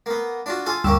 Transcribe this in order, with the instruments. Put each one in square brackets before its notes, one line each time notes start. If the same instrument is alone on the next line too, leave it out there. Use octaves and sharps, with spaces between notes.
[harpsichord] A#3 B3
D4 F4 F#4
F4 A4 G#5
[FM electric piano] D2 G2 E6 [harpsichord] A#3 C#4 G4